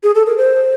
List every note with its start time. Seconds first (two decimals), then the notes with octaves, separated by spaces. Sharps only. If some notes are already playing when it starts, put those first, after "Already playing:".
0.03 G#4
0.15 A4
0.26 A#4
0.37 C5